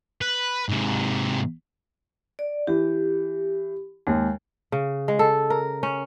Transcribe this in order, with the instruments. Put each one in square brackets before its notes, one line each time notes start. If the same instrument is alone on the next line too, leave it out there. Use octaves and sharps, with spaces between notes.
[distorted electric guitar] B4
G#2 C3
[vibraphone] D5
[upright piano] E3 [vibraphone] G4
[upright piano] D#2 [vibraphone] G#3
[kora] C#3
G#3
A4
A#4
C#4